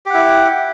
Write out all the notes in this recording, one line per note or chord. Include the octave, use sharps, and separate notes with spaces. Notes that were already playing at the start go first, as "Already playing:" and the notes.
E4 G4 F#5